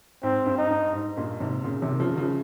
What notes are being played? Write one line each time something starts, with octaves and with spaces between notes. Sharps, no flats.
G#2 C4
G2
D#4
G2
G#2
G2 A#2
G#2 C3
A#2 C#3
C3 D#3
C#3 F3
D#3
C#3 F3